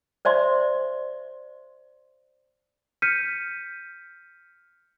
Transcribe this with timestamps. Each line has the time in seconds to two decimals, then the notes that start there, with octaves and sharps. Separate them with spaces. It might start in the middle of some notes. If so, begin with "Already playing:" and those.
0.25 C5 D5 E5 C6
3.02 F6 G6 B6 C#7 D#7